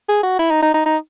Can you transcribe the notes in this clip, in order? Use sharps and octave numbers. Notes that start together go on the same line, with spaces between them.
G#4
F#4
E4
D#4
D#4
D#4
D#4